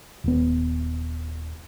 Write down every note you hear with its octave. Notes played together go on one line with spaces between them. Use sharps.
D#1 B3